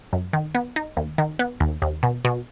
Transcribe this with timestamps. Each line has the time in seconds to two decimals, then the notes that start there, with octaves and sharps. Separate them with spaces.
0.13 F#2
0.33 D#3
0.55 B3
0.76 D#4
0.97 D#2
1.18 D#3
1.39 B3
1.60 D#2
1.82 D#2
2.03 B2
2.25 B2